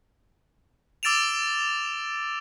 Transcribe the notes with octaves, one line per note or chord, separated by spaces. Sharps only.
D6 E6 A6 D7 E7 F7